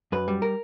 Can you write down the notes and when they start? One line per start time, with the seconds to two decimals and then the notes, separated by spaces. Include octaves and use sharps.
0.12 F#2 B4
0.28 G3
0.42 A#4